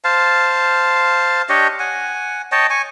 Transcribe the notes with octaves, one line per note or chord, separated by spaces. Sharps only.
C5 F5 A5
D4 G4 C#5 D#5
F#5 G#5
C#5 D#5 G5 A5
G#5 C#6